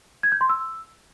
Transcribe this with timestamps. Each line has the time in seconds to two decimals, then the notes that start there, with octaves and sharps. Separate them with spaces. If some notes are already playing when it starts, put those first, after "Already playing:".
0.23 G#6
0.32 G6
0.41 C6
0.49 E6